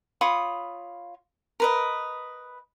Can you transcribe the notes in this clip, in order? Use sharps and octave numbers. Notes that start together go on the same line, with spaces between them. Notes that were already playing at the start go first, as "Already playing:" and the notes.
F4 C#5 B5 D#6
A#4 B4 D#5